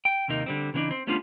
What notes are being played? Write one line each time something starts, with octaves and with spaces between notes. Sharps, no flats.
G5
D#2 C3 A#3 D#4
D3 G3 C4
C#3 E3 B3 C4 D4 D#4
C4
G3 A3 B3 C#4 D4 F4